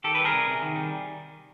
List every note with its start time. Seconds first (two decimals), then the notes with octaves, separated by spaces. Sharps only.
0.04 D#3 G4 A4
0.15 G3 B4
0.25 G#4 A#4
0.32 C3
0.47 C3
0.62 D#3
0.76 G3